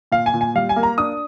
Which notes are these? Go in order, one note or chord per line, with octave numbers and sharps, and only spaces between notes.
A#2 F5
G#5
A#2
G#5
G3 F5
G#5
A#3
A#5
D4 D#6